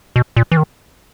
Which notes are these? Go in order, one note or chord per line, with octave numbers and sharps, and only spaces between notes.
B2
A#2
E3
D#3